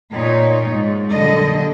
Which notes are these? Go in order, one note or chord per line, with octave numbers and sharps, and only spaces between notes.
A#2 D#4 C#5
G#2
A#2 D3 F#3 G3 A4 D#5